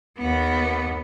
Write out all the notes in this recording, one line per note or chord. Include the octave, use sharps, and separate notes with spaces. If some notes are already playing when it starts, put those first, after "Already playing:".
D#2 B3